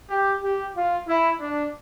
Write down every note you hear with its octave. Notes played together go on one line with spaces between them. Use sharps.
G4
G4
F4
E4
D4